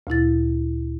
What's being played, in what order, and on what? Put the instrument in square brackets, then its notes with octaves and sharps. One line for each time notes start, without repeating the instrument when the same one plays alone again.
[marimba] D2 A#2 E4 A6